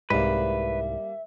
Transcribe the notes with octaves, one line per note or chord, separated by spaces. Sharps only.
C2 G#2 G3 A#3 B4 E5